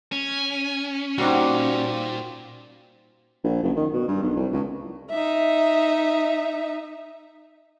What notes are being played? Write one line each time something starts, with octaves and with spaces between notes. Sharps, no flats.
C#4 G#5
A#2 G3 C4 D#4 F#4
A#1
F#1
D#3
B2
G2
B1
C2
C#2
D#4 E5